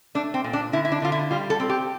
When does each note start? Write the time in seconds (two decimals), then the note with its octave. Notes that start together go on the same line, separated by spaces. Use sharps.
0.15 A3 D4
0.34 C4
0.44 A#2
0.53 D4
0.73 D3 E4
0.85 E4
0.92 D4
1.02 D3 F4
1.12 E4
1.31 G3 F4
1.50 A4
1.60 C4
1.69 G4